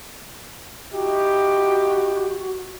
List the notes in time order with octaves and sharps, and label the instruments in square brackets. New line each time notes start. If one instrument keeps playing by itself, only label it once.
[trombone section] D#4 E4 G4 [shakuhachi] F#4